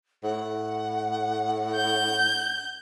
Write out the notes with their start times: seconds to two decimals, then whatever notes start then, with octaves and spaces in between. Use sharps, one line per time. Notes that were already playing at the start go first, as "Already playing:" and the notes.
0.24 A2 F#5
1.74 G6